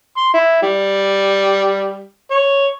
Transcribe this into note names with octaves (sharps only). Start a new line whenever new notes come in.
C6
E4
G3
C#5